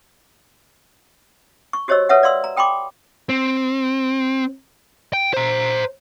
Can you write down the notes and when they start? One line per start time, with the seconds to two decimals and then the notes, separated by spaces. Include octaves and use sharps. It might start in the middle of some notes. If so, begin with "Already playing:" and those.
1.73 C#6
1.88 F#4 G4 C5 C#5 D#5 E6
2.09 A4 B4 C#5 E5 F#5
2.23 D5 F5 C6 E6
2.44 A#5
2.57 A4 G5 B5 C6 D6
3.29 C4
5.13 G5
5.34 C5 A#5